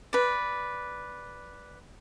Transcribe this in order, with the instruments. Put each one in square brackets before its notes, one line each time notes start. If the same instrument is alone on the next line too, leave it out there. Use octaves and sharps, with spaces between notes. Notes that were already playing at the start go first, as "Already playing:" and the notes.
[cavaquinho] B4 D5